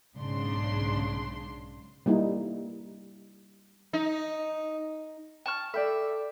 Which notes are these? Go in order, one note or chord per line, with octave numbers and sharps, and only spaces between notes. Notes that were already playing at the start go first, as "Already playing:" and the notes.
B1 G#2 C#3 D4 C6
G3 A#3 D#4 E4
D#4
A5 C#6 F6
A4 D5 E5 G5 B5